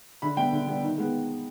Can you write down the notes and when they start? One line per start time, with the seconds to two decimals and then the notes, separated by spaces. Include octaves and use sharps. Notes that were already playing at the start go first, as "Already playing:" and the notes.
0.22 D3 B5
0.37 G3 B3 G5
0.52 D3
0.67 G3 B3
0.83 D#3
0.98 G#3 B3